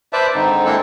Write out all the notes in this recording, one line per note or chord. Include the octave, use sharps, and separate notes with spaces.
B4 C5 D5 E5 A5
G#2 D3 D#3 C4 D#4
G#3 A#3 C4 D4 E4 A4